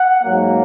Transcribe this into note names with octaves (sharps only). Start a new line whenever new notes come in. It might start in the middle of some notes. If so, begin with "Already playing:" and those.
Already playing: F#5
G#2 F#3 A#3